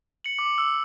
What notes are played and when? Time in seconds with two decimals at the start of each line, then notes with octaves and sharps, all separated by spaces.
0.24 C#7 F#7
0.39 D6
0.58 E6